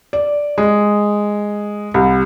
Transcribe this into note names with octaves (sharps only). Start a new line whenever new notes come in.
D5
G#3
C2